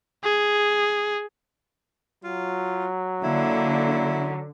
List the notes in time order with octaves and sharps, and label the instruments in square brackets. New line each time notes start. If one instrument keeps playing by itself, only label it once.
[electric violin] G#4
[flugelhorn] F#3 [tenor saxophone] F4
[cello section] D3 [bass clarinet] A#3 [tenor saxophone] E4